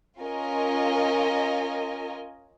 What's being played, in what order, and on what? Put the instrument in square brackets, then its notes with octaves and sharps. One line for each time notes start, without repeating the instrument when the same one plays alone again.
[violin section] C#4 F4 A#4 D#5 G#5